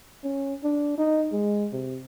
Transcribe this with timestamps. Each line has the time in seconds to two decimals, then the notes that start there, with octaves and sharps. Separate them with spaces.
0.24 C#4
0.64 D4
0.98 D#4
1.32 G#3
1.73 C3